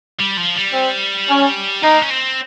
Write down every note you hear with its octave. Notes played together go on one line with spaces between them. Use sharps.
G3
F3
G3
C4
C#4
A#3 D#4
C#4
C4